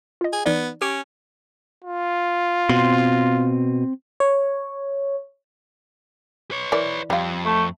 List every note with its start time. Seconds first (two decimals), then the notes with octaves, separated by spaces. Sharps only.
0.21 F4 D#5
0.33 G#4
0.46 E3 B3 D#4 D5
0.82 C#4 G4 C#6 D7
1.84 F4
2.69 B2 C4 C6
4.20 C#5
6.51 B4 C#5
6.72 E3 A#4 D5
7.10 F2 G3 F4
7.45 A3